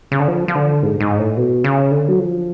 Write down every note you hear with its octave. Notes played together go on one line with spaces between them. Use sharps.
C#3
D3
F3
F3
D3
G#2
G#2
A2
B2
C#3
D3
F#3
F3